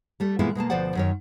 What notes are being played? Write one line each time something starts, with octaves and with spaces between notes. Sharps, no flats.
G3 A3
A#2 E3 G#3 B3 E4 F4
B2 G#3 A#3 A5
D2 B2 F3 C5 D5 F#5
F#2 D#3 C#5